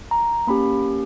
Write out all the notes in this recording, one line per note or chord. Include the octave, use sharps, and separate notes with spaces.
A#5
A#3 C#4 G4 B5